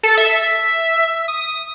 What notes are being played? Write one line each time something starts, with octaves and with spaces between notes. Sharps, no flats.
A4
E5
D#6